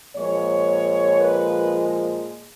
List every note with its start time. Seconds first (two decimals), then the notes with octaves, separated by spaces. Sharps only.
0.16 A#2 F3 G#3 C#5
1.20 B4